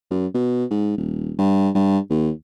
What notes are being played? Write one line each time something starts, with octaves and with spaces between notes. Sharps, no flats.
F#2
B2
G#2
D#1
G2
G2
D#2